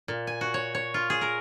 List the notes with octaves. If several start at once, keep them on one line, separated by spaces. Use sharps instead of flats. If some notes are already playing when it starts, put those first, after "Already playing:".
A#2
G#5
F#4
C#5
C#5
F4
G#4
A#4